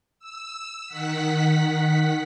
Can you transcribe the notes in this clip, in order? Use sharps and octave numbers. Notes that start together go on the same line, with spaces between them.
E6
D#3 F#5 B6